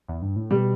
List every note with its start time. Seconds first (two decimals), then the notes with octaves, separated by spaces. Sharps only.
0.09 E2
0.22 G2
0.36 A2
0.51 B2 G3